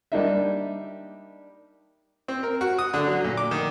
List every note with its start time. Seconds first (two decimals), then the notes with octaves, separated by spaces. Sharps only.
0.12 G3 A#3 D4 D#4 D#5 E5
2.28 C4
2.43 A#4
2.61 F#4
2.79 D#6
2.94 D3
3.07 F#3
3.24 A#2
3.37 D6
3.51 D#3